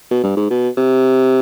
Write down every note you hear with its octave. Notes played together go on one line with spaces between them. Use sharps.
B2
G2
G#2
B2
C3